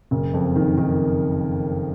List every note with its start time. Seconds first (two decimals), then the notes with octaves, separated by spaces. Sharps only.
0.11 F#1
0.34 F2
0.56 D#3
0.77 D#3